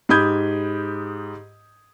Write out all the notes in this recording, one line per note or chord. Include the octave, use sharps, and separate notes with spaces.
G#2 G4 B5 D#6 G6 G#6